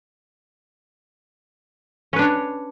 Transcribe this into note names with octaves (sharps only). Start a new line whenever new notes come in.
C#4 D4 B4 C#5